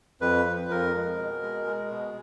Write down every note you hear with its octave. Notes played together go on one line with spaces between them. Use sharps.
F2 B4
F3
F2 A#4
G#3
B2
G#3
G#3
B2